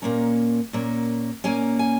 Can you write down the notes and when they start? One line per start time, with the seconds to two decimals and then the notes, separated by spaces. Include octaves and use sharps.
0.02 A#2 A#3 C#4 A#5
0.73 A#2 A#3 C#4
1.44 A#2 A#3 C#4 G#5
1.79 G#5